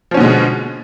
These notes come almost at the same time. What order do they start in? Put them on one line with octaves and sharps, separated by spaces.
F3 C#4 D3 B2 G#3